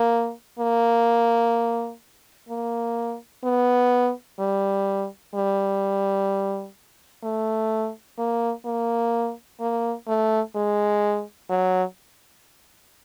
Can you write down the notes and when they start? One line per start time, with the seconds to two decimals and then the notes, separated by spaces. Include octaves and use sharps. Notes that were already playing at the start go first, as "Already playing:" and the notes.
Already playing: A#3
0.59 A#3
2.49 A#3
3.44 B3
4.39 G3
5.34 G3
7.23 A3
8.18 A#3
8.65 A#3
9.60 A#3
10.07 A3
10.56 G#3
11.50 F#3